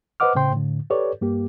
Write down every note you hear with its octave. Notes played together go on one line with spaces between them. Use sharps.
B4 C5 D#5 F#5 D6 F6
A2 C#3 C5 G5 C6
A2 D3
G4 A4 B4 C#5 D5
G2 A#3 G4